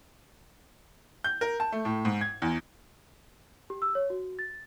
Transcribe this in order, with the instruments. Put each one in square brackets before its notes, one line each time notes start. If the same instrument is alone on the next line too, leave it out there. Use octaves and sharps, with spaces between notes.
[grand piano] G6
A#4
A5
A3
A2
G#2
G#6
E2
[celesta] G4
E6
C#5
F#4
A6